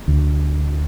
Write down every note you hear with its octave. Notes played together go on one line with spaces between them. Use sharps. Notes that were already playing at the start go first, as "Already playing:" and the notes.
D2